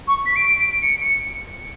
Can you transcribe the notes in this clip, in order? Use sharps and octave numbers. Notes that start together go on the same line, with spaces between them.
C#6
B6
D7
C#7
C#7